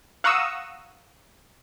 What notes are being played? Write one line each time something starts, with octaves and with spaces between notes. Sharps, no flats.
F5 F#5 A#5 C#6 D#6 E6